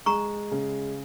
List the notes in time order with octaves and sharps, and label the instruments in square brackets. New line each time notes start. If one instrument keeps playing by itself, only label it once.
[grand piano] G#3 [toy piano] A#5 C#6
[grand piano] C#3